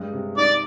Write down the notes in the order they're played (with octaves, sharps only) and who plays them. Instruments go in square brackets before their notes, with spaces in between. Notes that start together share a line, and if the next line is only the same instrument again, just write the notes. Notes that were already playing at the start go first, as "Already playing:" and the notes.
Already playing: [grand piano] G2 G#3
C3
[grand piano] D#4 [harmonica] D5